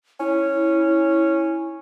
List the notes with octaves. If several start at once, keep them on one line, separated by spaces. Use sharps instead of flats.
C#4 E4